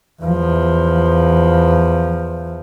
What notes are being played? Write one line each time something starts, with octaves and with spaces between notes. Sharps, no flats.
E2 F3